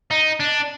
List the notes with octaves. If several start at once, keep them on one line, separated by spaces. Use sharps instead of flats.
D#4
D4